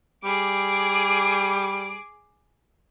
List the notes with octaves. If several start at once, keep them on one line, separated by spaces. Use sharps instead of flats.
G3 G#4 D6